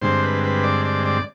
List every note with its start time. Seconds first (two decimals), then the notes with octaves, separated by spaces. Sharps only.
0.01 G2 D3 G#3 C4 C5
0.23 B4
0.43 B4
0.64 D5
0.85 D5
1.05 D5